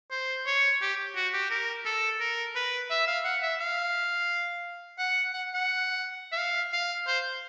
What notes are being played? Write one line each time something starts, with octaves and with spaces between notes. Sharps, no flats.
C5
C#5
G4
F#4
G4
A#4
A4
A#4
B4
E5
F5
F#5
E5
F5
F#5
F#5
F#5
E5
F5
F5
C5